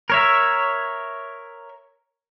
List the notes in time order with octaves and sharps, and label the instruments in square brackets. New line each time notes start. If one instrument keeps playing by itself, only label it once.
[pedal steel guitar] A#4 C#5 E5